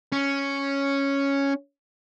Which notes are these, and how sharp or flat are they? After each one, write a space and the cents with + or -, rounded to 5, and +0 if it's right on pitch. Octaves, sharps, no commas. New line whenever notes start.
C#4 +0